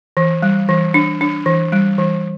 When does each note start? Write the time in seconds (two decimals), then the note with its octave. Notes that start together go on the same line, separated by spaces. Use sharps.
0.17 E3
0.42 G3
0.69 E3
0.94 D4
1.21 D4
1.46 E3
1.72 G3
1.98 E3